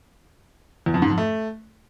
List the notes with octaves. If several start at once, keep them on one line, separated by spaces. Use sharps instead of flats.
E2
F2
G#2
F2
A3